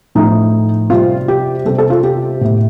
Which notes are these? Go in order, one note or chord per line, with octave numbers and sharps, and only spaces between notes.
A2 F3 A3 D#4
C3 G3 F4
G4
C3 G3 A4
A4
F4
G4
A2 A3